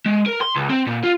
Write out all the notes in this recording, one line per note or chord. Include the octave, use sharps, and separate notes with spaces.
G#3
A#4
C6
C#2
C4
A#2
F4